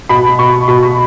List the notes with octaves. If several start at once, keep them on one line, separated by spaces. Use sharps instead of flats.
B2 B5
B2 C#6
B2 B5
C#6